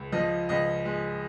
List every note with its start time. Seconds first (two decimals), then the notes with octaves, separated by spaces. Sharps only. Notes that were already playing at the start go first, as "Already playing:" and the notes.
Already playing: C#2
0.12 F3 D#5
0.49 C#2 D#5
0.85 G#3